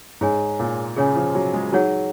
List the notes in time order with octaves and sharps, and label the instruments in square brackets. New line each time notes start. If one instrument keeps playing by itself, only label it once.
[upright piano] G#2 [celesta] G#4 C#5 G#5
[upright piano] A#2
[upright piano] C#3 [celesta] G#4 C#5 G#5
[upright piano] F3
F#3
G#3
[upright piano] F#3 [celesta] D#4 G#4 C#5 F#5